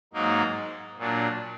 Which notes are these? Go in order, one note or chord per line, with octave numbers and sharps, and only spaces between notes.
G#2 F#3 A#3 D#4
A#2 F#3 D4